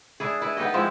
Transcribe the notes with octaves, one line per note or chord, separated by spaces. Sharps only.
D4 E4 G#4
E4 B4
B3 D#4 G4 D#5
F3 G#3 C4 E4